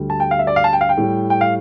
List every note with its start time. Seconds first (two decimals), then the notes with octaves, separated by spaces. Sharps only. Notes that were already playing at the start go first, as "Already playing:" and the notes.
Already playing: D2 D3 G3
0.10 A5
0.20 G5
0.31 F5
0.39 E5
0.47 D5
0.56 F5
0.64 A5
0.73 G5
0.81 F5
0.89 G5
0.97 A2 G3
1.30 G5
1.41 F5